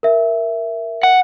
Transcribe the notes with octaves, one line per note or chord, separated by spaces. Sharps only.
A#4 E5
F#5